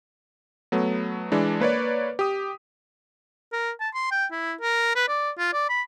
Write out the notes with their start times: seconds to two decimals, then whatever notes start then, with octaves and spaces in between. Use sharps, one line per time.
0.72 F#3 A3 B3
1.32 E3 G#3 D4
1.60 A#3 B4 C#5 D5
2.19 G4 D#6
3.52 A#4
3.80 A5
3.95 C6
4.11 G5
4.32 E4
4.61 A#4
4.96 B4
5.08 D5
5.38 F4
5.53 D5
5.69 B5